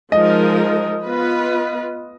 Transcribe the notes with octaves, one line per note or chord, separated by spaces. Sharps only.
F3 G#3 D#4 A#4 D#5
B3 F4 B4